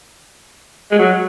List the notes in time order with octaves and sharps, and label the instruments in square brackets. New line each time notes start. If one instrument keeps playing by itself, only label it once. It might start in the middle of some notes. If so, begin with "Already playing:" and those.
[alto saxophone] G#3
F#3